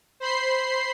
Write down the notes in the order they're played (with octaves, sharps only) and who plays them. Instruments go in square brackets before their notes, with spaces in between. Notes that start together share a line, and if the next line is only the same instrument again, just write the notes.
[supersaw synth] C5 B5 C6 C7